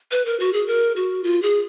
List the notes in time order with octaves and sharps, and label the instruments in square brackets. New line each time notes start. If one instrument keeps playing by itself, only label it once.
[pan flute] B4
A#4
F#4
G#4
A#4
F#4
F4
G#4